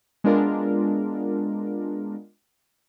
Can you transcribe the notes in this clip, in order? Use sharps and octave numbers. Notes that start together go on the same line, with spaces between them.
G#3 B3 D4 F4 A#4